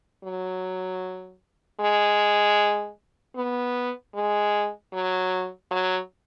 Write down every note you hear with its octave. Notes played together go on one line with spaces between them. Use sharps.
F#3
G#3
B3
G#3
F#3
F#3